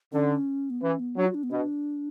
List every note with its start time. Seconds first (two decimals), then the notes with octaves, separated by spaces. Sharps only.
0.12 D3 C#4
0.70 B3
0.82 E3 C#4
0.99 B3
1.17 F#3 D4
1.26 F#4
1.34 D4
1.43 B3
1.51 B2 D4